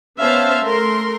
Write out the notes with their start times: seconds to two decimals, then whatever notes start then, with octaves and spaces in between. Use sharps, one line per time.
0.19 B3 C#4 C5 E5 F5 A5
0.65 A3 A#4 C6